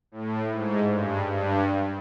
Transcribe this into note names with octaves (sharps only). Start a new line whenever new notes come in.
A2
G#2
G2
G2